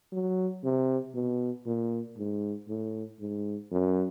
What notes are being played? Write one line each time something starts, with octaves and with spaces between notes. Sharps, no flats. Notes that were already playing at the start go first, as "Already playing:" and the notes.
F#3
C3
B2
A#2
G#2
A2
G#2
F#2